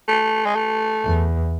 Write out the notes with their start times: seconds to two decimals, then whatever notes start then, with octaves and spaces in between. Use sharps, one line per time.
0.08 A3
0.46 G#3
0.56 A3
1.05 E2